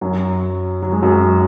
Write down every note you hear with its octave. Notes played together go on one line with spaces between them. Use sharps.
F#2 F#3
F#3
G#3
F#2 F#3
F#3